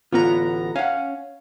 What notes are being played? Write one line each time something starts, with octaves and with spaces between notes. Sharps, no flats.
A1 D3 B3 F4 A#5
C#4 F5 F#5